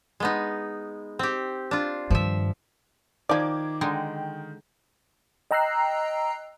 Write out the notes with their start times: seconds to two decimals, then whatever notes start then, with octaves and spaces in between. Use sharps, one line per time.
0.20 G#3 B3 D#4
1.19 C4 G4
1.71 D4 F4
2.10 G2 D#3 F3 E5
3.29 D#3 F3 D5 D6 G#6
3.81 D3 G#3 D#4 G5
5.51 D#5 G5 A#5 E6 F#6 C7